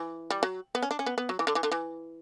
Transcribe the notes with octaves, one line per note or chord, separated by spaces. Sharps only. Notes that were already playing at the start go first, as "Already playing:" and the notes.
Already playing: E3
G3
F#3
B3
C#4
D4
C#4
B3
B3
F#3
E3
D3
E3
D3
E3